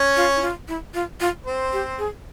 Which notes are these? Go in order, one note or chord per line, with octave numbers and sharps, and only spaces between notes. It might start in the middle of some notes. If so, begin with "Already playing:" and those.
Already playing: C#4 C#5
F4
E4
F4
E4
F4
F4
C4 C5
G4
G#4